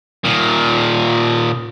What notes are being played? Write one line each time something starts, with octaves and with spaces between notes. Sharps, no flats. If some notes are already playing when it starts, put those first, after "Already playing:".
A#2 D#3